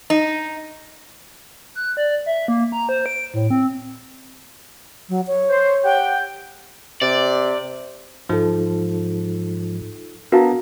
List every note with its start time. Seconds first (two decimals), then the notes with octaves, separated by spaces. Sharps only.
0.10 D#4
1.75 F#6
1.97 D5
2.26 E5
2.48 A#3
2.72 A#5
2.89 C5
3.06 D7
3.34 A2
3.50 C4
5.09 F#3
5.27 C#5
5.50 C5
5.85 G4 F#5 G5
7.02 C3 D5
8.29 G#2 F3 D#4 F4 A4
10.32 B3 D4 F#4 A#4 F5 A5 A#5